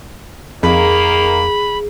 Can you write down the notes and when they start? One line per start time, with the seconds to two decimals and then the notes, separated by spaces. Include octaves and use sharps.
0.63 F2 D#3 A#3 G#4 B5